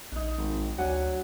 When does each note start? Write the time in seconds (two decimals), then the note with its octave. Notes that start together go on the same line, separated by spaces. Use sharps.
0.12 A#1 D4 D#4
0.37 G#1
0.78 D2 F#3 D4 F#5 G#5